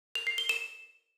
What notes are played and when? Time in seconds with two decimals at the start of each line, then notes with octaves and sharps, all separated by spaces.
0.15 F7
0.27 C7
0.38 G7
0.49 E7